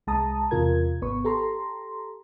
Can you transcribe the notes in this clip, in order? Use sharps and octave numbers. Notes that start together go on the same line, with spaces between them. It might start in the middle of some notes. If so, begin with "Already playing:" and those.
C2 G#3 A5 A#5 D#6
E2 C3 F4 A#4 G#6
G#1 B3 B4 C#6
G4 A4 A#5 C6